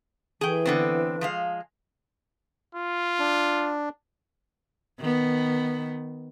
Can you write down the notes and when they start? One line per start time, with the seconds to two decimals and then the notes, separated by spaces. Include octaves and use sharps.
0.41 E3 G#4 G5
0.66 D3 B3 C4
1.21 F3 G#3 F5
2.75 F4
3.19 D4
5.00 D#3 B3